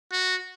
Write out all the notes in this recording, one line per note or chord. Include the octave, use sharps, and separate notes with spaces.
F#4